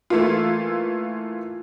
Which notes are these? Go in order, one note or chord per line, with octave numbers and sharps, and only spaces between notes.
E3 A3 A#3 F4